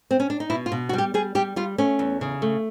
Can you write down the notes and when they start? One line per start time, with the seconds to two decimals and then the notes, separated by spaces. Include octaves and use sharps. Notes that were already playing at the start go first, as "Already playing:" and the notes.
0.11 C4
0.20 C#4
0.30 D4
0.40 D#4
0.50 B2 E4
0.66 F4
0.72 B2
0.89 F#4
0.93 G3 G4
1.14 G3 G#4
1.35 G3 G4
1.56 G3 F4
1.78 A3 C#4
1.99 E2
2.21 C#3
2.42 A3